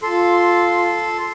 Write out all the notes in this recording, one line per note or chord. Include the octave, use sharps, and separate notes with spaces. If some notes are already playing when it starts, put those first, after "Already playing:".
F4 A4 C6